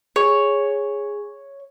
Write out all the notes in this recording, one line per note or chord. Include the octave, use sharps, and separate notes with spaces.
G#4 C#5